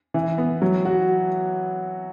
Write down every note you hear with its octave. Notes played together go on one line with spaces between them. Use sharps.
E3
B3
F#3
F#4